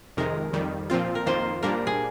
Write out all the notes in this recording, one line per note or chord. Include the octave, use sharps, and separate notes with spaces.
F2 C3 D#3 G#3 A#4
F2 D#3 G3
A#2 F3 C4 F4
A#4
F2 D#3 A#3 F4 C5
A#2 G3 A#3 D4 A#4
G#4